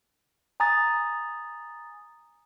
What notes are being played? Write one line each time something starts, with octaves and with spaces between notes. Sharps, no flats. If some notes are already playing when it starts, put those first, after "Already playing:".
G#5 A#5 D#6 A6